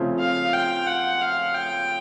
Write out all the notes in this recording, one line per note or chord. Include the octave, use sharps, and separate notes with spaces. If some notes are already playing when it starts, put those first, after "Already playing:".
Already playing: C#3 F3 A3 C4 F4
F5
G5
F#5
F5
G5